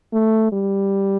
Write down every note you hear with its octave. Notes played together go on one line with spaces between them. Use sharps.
A3
G3